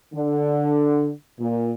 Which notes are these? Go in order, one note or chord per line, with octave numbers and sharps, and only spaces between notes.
D3
A#2